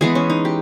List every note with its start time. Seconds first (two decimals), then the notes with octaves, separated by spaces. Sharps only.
0.01 E3 G#3 B3 G#4
0.15 C#4
0.30 D#4
0.45 G4